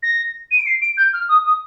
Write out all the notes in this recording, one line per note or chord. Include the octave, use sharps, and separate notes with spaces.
A#6
D#7
D7
C7
D7
G6
F6
D#6
D#6